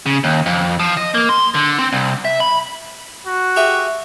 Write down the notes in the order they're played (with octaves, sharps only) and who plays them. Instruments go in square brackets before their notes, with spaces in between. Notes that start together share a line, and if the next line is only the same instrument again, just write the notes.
[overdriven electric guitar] C#3
D#2
F2
F3
D#5
A#3
C6
D3
C4
C2
E5
B5
[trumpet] F#4
[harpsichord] G4 G#4 E5